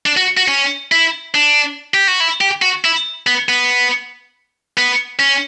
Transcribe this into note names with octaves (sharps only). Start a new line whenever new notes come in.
D4
F#4
F#4
C#4
E4
D4
G4
F#4
E4
G4
F#4
E4
B3
B3
B3
C#4